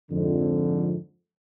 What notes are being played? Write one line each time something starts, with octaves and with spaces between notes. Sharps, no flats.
F2 G#2 D3